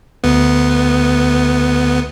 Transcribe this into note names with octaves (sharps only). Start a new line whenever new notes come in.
D2 B3